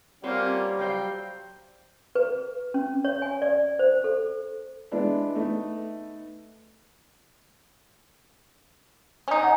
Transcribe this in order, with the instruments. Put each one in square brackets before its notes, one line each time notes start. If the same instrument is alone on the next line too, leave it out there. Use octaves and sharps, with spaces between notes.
[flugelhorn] G3 [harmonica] A#3 C#4 F4 [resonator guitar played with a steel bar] C4 C5 F#5
[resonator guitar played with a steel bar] F#3 C5 F5 [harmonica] G5
[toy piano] B4
C#4
C#5
G#5
D5
C5
A4
[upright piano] E3 G#3 B3 D4 E4
A3 B3 D#4
[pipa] C#4 D#4
[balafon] F#5 G#5